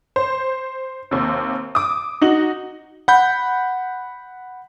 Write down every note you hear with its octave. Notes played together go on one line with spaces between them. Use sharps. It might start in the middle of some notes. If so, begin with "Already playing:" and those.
C5
D#2 C3
D6 D#6
D#4 F#4 F#7
F#5 B5 G6